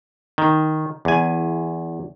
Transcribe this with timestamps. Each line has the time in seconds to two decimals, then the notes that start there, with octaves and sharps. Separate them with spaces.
0.38 D#3
1.05 E2 G#5